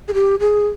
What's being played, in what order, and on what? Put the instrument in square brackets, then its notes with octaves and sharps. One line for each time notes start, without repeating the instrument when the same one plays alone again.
[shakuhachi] G#4
G4
G#4